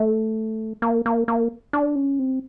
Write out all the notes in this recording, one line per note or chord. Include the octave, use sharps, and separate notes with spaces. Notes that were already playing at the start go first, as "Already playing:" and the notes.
Already playing: A3
A#3
A#3
A#3
D4
C#4
C4